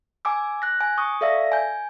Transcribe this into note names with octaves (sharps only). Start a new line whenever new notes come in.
G#5 D6 E6
F#6 A#6
G#5
C#6 D#6
A4 D5 E5 F5 E6 A#6
G#5 G6